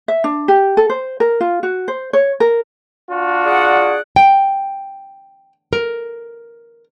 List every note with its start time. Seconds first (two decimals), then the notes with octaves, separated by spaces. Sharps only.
0.08 E5
0.24 D4
0.48 G4
0.77 A4
0.90 C5
1.20 A#4
1.41 F4
1.63 F#4
1.88 C5
2.13 C#5
2.40 A#4
3.10 D4 F4 F#4
3.45 G#4 D5 F#5
4.16 G5
5.73 A#4